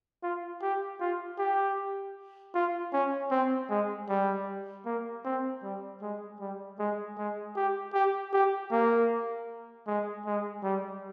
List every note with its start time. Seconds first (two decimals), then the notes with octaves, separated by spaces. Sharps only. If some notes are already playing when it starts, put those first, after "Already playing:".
0.23 F4
0.62 G4
1.00 F4
1.39 G4
2.55 F4
2.93 C#4
3.31 C4
3.70 G#3
4.09 G3
4.86 A#3
5.25 C4
5.63 G3
6.02 G#3
6.41 G3
6.79 G#3
7.18 G#3
7.56 G4
7.94 G4
8.33 G4
8.72 A#3
9.87 G#3
10.26 G#3
10.64 G3